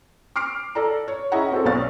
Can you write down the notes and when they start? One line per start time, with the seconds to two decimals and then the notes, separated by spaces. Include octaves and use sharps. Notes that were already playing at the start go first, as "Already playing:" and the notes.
0.36 D6 F6 C7 D7
0.75 A4 D5 A#5
1.08 C#5
1.32 C#4 E4 G#4 D#5 F#5 A#5
1.51 C4 F#4 A4
1.65 B1 B3 C#4 D5 F5 A6